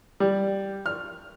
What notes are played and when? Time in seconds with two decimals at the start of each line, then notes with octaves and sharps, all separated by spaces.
0.20 G3
0.86 F6